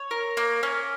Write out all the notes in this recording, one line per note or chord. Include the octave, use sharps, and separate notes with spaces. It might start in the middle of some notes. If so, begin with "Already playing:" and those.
Already playing: C#5
A#4
A#3
C#4